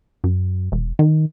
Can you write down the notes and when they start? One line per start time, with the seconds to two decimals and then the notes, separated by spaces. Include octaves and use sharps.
0.24 F#2
0.72 E1
0.99 D#3